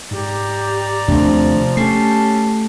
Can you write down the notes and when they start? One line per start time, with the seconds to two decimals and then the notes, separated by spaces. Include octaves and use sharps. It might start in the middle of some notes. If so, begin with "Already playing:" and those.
0.11 G#2 G4 D5 A#5
1.08 D#2 C3 F3 A3 C4 D4
1.77 A3 C#4 G4 A5 C7